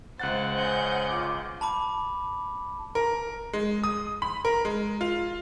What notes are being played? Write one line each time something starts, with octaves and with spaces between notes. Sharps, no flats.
C#2 C5 F#5 F#6 A6
C#4 C5 D#5 G#5 G6
F4 D6
A5 B5 D6
A#4
G#3
D#6
B5
A#4
G#3
F4